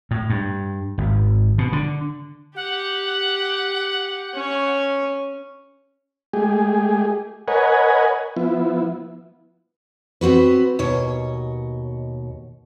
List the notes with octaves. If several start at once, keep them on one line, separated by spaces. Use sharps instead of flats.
A2
G2
G#1
B2
D3
G4 F#5
C#4 C#5
G#3 A3 G4 G#4
A#4 B4 C#5 D#5 F#5 G#5
F3 B3 E4
B3 C4 F#4 B4
D#2 B2 C#5 D#5